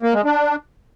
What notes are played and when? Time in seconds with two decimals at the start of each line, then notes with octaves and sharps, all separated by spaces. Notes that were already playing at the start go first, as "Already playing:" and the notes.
0.03 A#3
0.14 G#3
0.25 D4